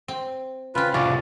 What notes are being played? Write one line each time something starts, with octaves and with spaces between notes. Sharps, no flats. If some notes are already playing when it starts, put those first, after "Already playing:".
C4
C#3 C4 F4 B4
C2 C#4 F4 D5